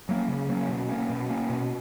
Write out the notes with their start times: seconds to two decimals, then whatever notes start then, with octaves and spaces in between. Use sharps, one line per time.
0.09 F#3 A#3 C#4
0.28 C#3
0.49 F#3 A#3 C#4
0.69 B2
0.89 A#3 C#4
1.10 B2
1.30 A#3 C#4
1.50 B2